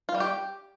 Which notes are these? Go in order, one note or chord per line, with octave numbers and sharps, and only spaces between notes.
F4
G3
G4